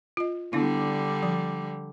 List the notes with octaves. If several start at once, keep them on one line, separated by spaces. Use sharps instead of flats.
F4 D#5
D3 G3 B3 D4 E4
F3